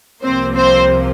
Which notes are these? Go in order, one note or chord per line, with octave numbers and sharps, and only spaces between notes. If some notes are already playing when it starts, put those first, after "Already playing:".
C2 C3 F3 A#3 C4 C5
C4 C5